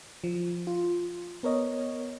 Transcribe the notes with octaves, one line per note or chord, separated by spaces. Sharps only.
F3
F4
B3 A#4 C#5 D#5